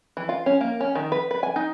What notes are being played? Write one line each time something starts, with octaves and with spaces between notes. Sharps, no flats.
E3
F4
C#4
A#3
C#4
D#3
B4
B4
G#5
D#4